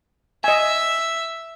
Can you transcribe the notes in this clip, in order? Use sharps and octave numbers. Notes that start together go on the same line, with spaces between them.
D#5 E5 G#5